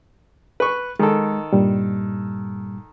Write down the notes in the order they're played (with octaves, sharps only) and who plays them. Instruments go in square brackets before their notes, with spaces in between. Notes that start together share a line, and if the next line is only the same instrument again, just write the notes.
[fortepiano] B4 C#6
[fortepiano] D#3 A4 [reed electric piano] G#3
[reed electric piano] G2 A#2 G3